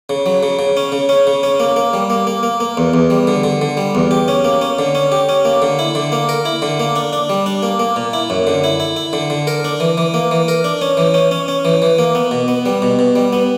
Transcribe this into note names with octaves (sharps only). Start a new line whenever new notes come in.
C#3
F#3
C#3
C#3
C#4
C#3
C#4
C#3
C#4
A#3
A#3
G3
A#3
A#3
A#3
A#3
E2
E2
G3
D3
D3
D3
G3
E2
G4
C#4
A#3
C#4
D3
C#4
G4
C#4
A#3
D3
E4
D3
A#3
A#4
E4
D3
A#3
D4
D4
G3
D4
A#3
A#3
A#2
E4
F#2
D3
E4
E4
E4
D3
D3
A#4
D4
E3
E3
A#3
E3
A#4
D4
C#4
E3
C#4
C#4
C#4
E3
E3
A#3
B3
B2
B3
G3
B2
B2
G3
B3